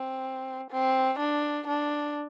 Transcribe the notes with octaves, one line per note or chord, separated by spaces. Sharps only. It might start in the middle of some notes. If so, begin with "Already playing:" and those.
Already playing: C4
C4
D4
D4